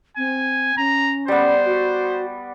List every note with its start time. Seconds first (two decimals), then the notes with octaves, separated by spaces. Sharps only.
0.17 C4 G#5
0.77 C#4 A#5
1.28 G3 B3 C5
1.66 F#4